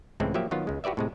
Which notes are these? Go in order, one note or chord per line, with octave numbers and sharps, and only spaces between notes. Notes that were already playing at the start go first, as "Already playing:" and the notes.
C#2 A2 E3 G#3 C4
F3 F#3 A#3 G4 E5
D#3 F#3 B3 F4
C#2 G#3
F#4 G4 B4 D5 E5
A2 C3 G#3